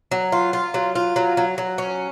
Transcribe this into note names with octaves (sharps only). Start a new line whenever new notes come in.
F#3
F4
F4
F#3
F4
F#3
F#3
F#3
C#4